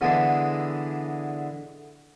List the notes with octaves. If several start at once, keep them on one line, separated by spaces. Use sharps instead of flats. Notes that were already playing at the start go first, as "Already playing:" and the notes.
D3 E3 G#3 B3 D4 E4